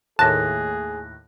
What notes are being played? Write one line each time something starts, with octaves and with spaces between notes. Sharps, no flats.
D#2 A2 G#4 A5 F#6 A#6